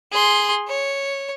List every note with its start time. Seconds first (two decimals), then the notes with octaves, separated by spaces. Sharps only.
0.12 G#4 C6
0.68 C#5